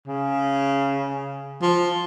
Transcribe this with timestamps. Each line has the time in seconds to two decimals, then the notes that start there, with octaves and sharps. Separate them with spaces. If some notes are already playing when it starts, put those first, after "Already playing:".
0.07 C#3
1.62 F3